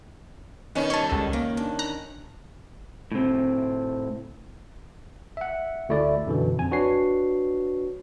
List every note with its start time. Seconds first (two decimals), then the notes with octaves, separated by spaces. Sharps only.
0.75 D#3 B3 C#4 C#5 D#5
0.90 G3 C#5 A5
1.09 C#2 A4
1.33 A#3
1.57 D4
1.79 A#5 F#6
3.12 A2 C3 C4
5.37 E5 F#5
5.89 D2 A3 E4 D5
6.26 F#2 B2 D3 E3
6.58 F2 G#5
6.71 D4 F#4 B4 C#5 C7